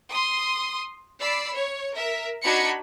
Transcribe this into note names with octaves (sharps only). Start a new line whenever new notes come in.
C6 D#6
D5 B5 E6 C7
C#5
A#4 E5
D4 D#4 F#4 B5 G#6 C#7